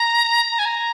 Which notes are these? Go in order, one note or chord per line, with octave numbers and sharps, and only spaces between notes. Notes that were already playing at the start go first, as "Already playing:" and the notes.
Already playing: A#5
A#5
G#5
A#5